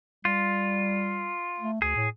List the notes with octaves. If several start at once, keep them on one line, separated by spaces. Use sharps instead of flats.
G3 F4
A3
D2 G#4
A2